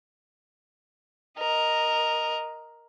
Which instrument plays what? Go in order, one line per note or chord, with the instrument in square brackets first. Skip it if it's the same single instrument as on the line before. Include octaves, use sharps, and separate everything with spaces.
[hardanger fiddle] A#4 D#5